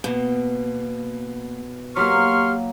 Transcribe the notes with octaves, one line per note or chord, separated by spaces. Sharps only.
B2 A#3
F#3 A#3 G4 C6 C#6 F6